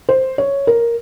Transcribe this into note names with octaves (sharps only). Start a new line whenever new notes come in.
C5
C#5
A#4